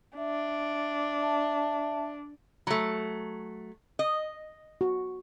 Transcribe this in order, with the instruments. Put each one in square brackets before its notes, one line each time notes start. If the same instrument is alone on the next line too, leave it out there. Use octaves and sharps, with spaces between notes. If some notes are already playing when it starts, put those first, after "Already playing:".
[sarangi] D4 [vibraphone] E5
[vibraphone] E5 A5
[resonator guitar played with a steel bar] F#3 A3 [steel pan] B5
[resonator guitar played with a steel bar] D#5
[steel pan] F#4